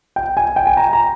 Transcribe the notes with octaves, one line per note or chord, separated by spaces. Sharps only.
G5
G#5
G5
G#5
A#5
A#5